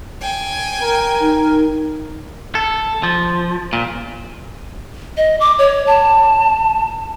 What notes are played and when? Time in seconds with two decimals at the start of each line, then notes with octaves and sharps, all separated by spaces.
0.21 G5 G#5
0.82 A#4
1.21 D#4
2.55 A4
3.03 F3
3.73 A#2
5.17 D#5
5.40 D6
5.59 C#5
5.87 A5